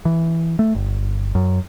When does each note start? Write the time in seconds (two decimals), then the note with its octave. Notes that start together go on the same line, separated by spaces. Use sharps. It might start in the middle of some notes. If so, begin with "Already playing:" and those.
0.05 E3
0.59 A3
0.75 G1
1.35 F#2